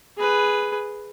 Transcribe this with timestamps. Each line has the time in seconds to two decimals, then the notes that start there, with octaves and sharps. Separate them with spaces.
0.18 G#4 B4